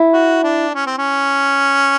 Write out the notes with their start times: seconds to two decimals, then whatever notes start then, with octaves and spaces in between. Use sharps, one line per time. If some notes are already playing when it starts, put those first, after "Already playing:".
Already playing: E4
0.13 F#4
0.43 D4
0.74 C#4
0.86 C4
0.98 C#4